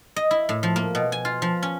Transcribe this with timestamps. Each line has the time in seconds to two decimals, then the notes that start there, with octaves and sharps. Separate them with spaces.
0.16 D#5
0.31 E4
0.49 A2
0.63 F3
0.76 A#3
0.95 B2
1.12 G#5
1.25 F4
1.42 F3
1.63 C#4